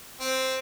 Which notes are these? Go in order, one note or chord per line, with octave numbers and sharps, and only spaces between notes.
C4